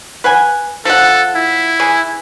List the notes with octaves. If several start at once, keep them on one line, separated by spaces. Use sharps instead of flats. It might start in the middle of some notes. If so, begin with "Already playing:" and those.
B4 F#5 G#5
F3 A4 F#5
E4
E3 G#4